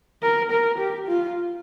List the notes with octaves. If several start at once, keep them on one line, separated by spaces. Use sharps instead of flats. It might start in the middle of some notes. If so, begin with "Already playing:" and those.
A#4
A#4
G4
F4